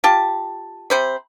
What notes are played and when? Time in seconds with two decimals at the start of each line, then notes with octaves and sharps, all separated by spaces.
0.04 F4 G4 A5
0.90 C3 C5 B5